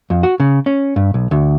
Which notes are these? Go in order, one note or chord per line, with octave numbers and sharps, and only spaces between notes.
F2
F#4
C#3
C#4
G2
B1
D2